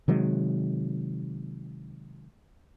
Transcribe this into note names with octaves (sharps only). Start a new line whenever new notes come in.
C3 D#3 F#3 G#3